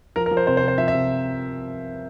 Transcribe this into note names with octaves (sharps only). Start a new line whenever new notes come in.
F3 A#4
A#4
F3
C5
C3 C5
C5
C3
C5
F3 E5
E5
C3